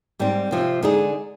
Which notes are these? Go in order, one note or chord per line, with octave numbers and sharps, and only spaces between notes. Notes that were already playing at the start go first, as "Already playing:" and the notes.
G#2 G3 C4
C3 F3 C4
D3 G#3 D#4 G#4